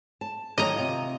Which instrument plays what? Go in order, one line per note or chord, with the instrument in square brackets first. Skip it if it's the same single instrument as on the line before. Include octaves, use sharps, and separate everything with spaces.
[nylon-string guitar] A5
[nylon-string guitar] D#3 F#3 C#4 [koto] D#5 A#5
[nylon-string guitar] C3 F4